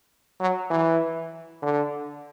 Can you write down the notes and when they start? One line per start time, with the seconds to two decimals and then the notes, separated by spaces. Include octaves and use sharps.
0.40 F#3
0.70 E3
1.62 D3